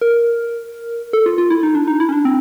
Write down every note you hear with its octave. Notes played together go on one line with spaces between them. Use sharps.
A#4
A4
F4
F4
E4
D#4
D4
D#4
E4
C#4
D4
C4